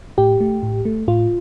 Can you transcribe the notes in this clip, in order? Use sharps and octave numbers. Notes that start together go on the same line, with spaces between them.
A2 G4
A3
A2
A3
A2 F4